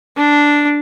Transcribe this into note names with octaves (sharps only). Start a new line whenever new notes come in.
D4